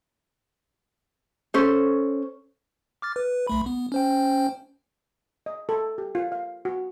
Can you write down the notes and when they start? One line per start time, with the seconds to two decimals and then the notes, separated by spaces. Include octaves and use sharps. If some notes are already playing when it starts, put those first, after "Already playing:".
1.54 C#4 A4 C5
3.02 D6 F6 A6
3.16 B4
3.47 B1 A3 B5
3.66 B3
3.92 C#4 C5 G5
5.46 D#5
5.69 A4
5.98 G4
6.15 F4
6.32 F5
6.65 F#4